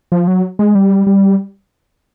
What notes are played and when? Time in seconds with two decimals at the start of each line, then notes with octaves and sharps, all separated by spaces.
0.12 F3
0.27 F#3
0.59 G#3
0.75 G3
1.07 G3